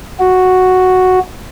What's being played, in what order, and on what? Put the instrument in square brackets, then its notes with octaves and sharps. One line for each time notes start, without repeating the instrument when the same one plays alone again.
[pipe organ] F#4